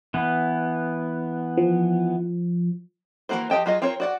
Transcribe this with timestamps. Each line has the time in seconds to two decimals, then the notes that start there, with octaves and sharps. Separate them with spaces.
0.14 E3 B3
1.57 F3
3.29 E3 G#3 A#3 F#4 C5
3.50 F3 G4 D#5 G5 A5
3.66 F#3 F4 G#4 D#5
3.82 C4 F4 A#4 C#5
4.00 F#4 D5 F#5